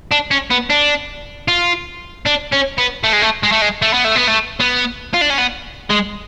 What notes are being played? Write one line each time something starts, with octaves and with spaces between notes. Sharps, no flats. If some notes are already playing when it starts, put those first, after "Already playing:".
D4
C#4
B3
D4
F4
D4
C#4
B3
A3
G#3
A3
G#3
A3
G#3
A3
B3
A3
B3
A3
B3
F4
D4
C#4
B3
G#3